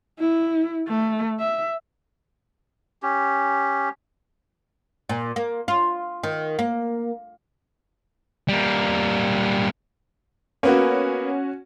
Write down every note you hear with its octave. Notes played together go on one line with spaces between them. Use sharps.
E4
A3
E5
C#4 G4
A#2
A#3
F4
D#3
A#3
G3 A#3
A#3 B3 C#4 F#4